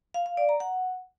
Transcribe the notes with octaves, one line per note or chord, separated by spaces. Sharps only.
F5
F5
D5
A#5
F#5